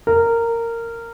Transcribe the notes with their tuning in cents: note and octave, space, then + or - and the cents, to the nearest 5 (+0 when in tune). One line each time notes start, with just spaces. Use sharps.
A#4 -15